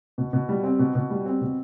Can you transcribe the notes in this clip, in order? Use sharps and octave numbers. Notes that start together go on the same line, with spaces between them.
B2
B2
G3
C4
B2
B2
G3
C4
B2